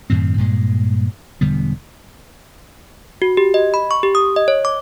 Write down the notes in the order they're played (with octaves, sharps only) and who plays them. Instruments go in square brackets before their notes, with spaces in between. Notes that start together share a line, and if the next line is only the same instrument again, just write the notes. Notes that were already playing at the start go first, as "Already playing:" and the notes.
[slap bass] F#2 A2 D#3 C4
G2 A#2 G#3
E1 D3 G3 B3
[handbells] F#4
G4
D#5
B5
C#6
G4
D#6
D#5
C#5
D6